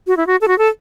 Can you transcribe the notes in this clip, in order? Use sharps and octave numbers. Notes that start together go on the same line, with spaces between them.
F#4
E4
F#4
A4
F#4
A4